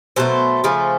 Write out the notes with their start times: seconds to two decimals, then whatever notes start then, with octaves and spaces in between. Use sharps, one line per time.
0.16 B2 F#3 A3 C5
0.64 C#3 F3 A3